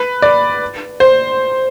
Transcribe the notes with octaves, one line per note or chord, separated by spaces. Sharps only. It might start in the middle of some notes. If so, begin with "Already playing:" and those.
Already playing: B4
D5
C5